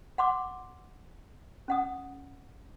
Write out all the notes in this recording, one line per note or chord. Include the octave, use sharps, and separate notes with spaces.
F#5 C6 D6
C#4 F#5 D#6